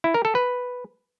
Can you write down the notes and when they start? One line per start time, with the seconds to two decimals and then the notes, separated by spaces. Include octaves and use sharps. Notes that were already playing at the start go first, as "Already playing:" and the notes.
0.04 E4
0.14 A#4
0.25 A4
0.35 B4